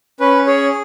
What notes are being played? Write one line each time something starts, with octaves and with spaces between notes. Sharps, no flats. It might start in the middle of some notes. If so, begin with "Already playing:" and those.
C#4 B4
G#4 C#5